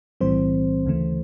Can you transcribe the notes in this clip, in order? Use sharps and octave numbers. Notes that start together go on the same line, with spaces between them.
B1 A2 E3 G3 C4 C5
D2 C#3 E3 A3